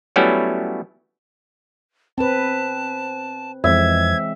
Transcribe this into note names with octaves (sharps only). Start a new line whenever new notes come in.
F#3 G3 A3 B3 C#4 E4
C4 B4 A5
F2 E3 G#3 C4 E5 G#6